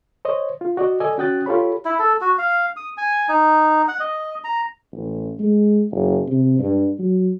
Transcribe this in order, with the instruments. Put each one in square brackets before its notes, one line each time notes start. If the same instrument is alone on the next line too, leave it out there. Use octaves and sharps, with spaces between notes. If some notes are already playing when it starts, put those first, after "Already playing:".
[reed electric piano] C5 C#5 D#5
F4
F#4 D5 D#5
A4 D5 D#5 G#5 E6
C#4 F#4 G5 D#6 F#6 A6
F4 G4 A4 C#5 B5
[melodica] E4
A4
F#4
F5
D#6
G#5
D#4
F#5
D#5
A#5
[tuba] A1
G#3
F#1
C3
G2
F#3